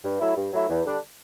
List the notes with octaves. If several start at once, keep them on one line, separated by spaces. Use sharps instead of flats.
G2
F#3 A3 E4
G2
F#3 A3 E4
E2
D3 G3 D4